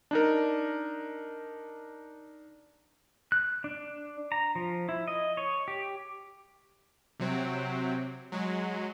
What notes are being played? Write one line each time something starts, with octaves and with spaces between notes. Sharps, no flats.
D4 D#4 A#4
F#6
D4
A#5
F3
E4
D#5
C#5
G4
C3 F#3 C4
F#3 G#3